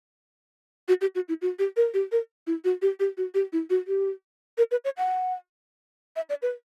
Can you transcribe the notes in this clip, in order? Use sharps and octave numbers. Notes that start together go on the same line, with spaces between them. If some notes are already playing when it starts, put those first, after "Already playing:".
F#4
G4
F#4
E4
F#4
G4
A#4
G4
A#4
E4
F#4
G4
G4
F#4
G4
E4
F#4
G4
A#4
B4
C#5
F#5
E5
D5
B4